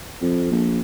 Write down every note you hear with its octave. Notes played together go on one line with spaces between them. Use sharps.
F2
A#1